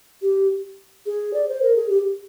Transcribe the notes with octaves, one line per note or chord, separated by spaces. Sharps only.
G4
G#4
D5
C5
A#4
G#4
G4